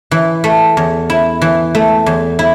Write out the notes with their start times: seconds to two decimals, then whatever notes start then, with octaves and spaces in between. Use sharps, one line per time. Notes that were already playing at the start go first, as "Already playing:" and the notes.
0.11 E3
0.44 A3
0.77 E2
1.10 E4
1.42 E3
1.75 A3
2.06 E2
2.39 E4